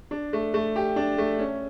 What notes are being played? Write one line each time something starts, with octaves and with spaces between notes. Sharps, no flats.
D4
A3
A3
G4
D4
A3
C#4